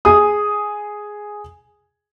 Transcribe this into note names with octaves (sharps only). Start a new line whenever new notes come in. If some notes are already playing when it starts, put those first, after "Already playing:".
G#4 D#6